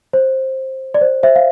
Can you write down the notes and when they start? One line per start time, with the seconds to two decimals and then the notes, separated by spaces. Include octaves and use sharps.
0.13 C5
0.94 D5
1.01 C5
1.23 C5 E5
1.36 F5